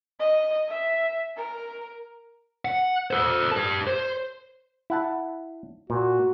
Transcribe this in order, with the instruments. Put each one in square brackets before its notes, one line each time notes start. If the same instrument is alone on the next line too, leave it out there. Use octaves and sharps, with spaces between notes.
[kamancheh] D#5
E5
A#4
[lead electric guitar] F#5
A4 C5
G4 A5
C5
[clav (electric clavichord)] E4 F#5 A5
[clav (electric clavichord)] A#2 [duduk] F#4